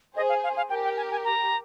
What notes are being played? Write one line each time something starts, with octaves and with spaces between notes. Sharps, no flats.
G#4 C5 D#5
F5
F5
F5
G4 A#4 G5
G5
G#5
G#5
A#5